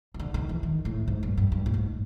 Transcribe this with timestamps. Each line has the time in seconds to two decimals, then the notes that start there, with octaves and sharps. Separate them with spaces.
0.14 D#3
0.20 D3
0.34 D#3
0.49 E3
0.63 D#3
0.85 A2
1.08 G#2
1.23 G2
1.37 G2
1.52 G2
1.66 A2
1.74 G#2